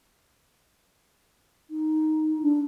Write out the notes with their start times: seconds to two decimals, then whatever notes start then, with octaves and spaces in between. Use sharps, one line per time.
1.70 D#4
2.42 D4